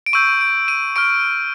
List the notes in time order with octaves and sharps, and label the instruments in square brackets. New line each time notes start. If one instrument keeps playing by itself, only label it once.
[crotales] D7
C#6 E6 G6 D#7
D7
D#7
C#6 F6 D7